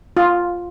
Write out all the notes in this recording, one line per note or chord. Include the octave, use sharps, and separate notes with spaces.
F4